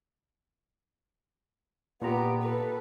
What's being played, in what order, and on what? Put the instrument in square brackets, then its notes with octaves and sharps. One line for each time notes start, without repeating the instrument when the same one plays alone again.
[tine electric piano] A#2 F4 A#5 [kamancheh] B3 G4
[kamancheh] A4 B4